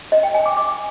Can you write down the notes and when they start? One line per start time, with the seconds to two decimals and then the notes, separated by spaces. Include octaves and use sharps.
0.12 D#5
0.23 G5
0.34 G#5
0.46 D6
0.57 D6